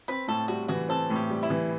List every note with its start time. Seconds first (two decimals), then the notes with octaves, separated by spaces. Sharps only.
0.08 C4 B4
0.28 A2 A4
0.48 G3 F#4
0.68 E3 F#4
0.89 C4 A4
1.10 A2
1.16 G4
1.30 G3
1.43 E4
1.50 E3